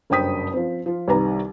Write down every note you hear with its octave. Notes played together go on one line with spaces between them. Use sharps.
F#1 G2 C5 G5 D#6 B6
F3 C4
F3 F4
C2 D#3 G3 B4 A#5